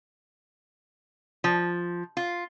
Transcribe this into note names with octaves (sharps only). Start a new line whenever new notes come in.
F3
F4